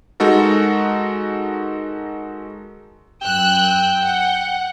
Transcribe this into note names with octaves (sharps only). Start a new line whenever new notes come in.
G#3 D#4 F#4 A4 A#4
F#2 G5 E6 F#6
F#5